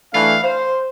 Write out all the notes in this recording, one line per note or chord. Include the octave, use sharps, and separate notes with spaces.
E3 A3 D4 F5
C5